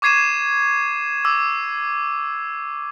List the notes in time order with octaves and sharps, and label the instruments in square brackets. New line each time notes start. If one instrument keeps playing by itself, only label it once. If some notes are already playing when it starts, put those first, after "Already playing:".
[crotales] C#6 D6 G#6 C7 D#7 E7
D6 E6